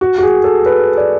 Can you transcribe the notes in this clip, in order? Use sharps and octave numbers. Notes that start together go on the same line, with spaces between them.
F#4
F#4
G#4
A4
B4
D5